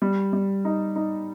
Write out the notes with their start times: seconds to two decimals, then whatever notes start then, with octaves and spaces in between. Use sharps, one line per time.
0.02 G3
0.33 G3
0.65 D#4
0.96 D#4